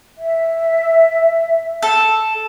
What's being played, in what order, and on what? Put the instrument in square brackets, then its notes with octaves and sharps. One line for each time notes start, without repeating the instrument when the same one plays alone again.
[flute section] E5
[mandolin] A4